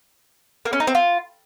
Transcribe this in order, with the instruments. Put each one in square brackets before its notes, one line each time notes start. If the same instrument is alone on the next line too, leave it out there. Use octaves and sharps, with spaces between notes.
[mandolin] A#3
C#4
D#4
C4
F4